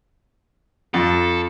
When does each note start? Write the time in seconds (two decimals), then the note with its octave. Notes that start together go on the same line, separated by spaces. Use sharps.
0.94 F2 A4